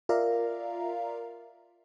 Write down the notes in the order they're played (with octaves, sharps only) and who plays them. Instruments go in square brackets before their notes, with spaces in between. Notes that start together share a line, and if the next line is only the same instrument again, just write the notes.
[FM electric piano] F4 A#4 D5 E5 F5 A#5